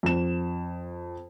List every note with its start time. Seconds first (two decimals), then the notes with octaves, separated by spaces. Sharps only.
0.03 F2 E7